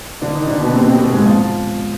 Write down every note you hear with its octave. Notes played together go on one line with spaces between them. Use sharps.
D3 D4
D#3 D#4
D3 D4
B2 B3
C3 C4
C3 C4
B2 B3
G#2 G#3
F3 F4